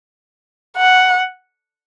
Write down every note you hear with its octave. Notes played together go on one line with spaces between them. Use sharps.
F#5